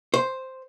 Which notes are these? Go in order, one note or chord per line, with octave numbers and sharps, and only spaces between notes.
C5